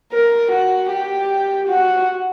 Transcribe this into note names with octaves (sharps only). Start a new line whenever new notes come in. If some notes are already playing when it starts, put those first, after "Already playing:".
A#4
F#4
G4
F#4